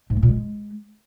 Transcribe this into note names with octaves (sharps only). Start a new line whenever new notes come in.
G#2
A#3
A#2
G#3